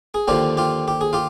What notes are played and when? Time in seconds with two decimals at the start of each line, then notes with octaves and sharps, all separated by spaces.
0.14 G#4
0.28 D#2 D3 F3 F4 G4
0.57 F4 G4
0.88 G4
1.01 G#4
1.13 F4 G4